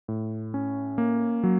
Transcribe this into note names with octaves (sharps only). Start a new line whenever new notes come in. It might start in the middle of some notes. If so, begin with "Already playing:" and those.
A2
C#4
A#3
F#3